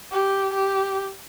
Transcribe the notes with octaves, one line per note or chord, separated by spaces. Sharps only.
G4
G4